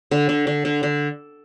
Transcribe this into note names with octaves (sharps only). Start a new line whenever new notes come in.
D3
D3
D3
D3
D3